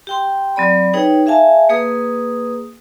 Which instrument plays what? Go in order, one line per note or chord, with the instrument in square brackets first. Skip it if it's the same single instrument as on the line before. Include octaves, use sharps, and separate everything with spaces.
[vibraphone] G4 G5 C6
F#3 C4 D5 B5
D#4 G#4 B4 C#5 G5
G#4 E5 F5 G#5 A5
A#3 G#4 B4 D#6